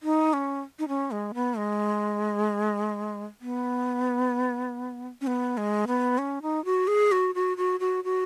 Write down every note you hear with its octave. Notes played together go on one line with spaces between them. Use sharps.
D#4
C#4
D#4
C#4
G#3
B3
G#3
B3
C#4
B3
G#3
B3
C#4
D#4
F#4
G#4
F#4
F#4
F#4
F#4
F#4